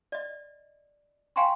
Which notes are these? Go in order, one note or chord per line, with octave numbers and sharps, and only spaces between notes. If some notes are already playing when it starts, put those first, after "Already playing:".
D5 D#5
F5 G5 G#5 A#5 C6 C#6